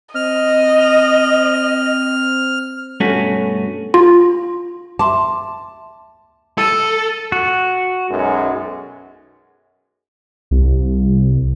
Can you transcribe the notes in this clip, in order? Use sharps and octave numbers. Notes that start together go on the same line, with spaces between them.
C4 D#5 F6
G2 B2 A3 C#4 F#4
F4
E5 A5 C6 D6
A4 E6 A6 D#7
F#4
B1 F#2 G#3
C2